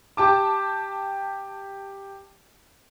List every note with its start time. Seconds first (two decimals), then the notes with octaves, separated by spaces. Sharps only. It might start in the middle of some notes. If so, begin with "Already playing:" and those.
0.17 G4 A5 D6